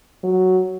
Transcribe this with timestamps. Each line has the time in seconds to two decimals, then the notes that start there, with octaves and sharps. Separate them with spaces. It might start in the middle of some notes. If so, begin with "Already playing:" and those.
0.24 F#3